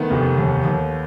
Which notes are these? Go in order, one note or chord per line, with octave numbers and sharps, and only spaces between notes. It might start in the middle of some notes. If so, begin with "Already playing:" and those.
Already playing: D#3 A3 B3
F1
D#2
D#2